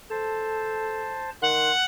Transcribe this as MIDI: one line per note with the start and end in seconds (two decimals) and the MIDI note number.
0.10 1.17 69
0.10 1.30 72
0.10 1.30 81
1.42 1.70 51
1.42 1.85 78
1.42 1.72 84
1.42 1.72 90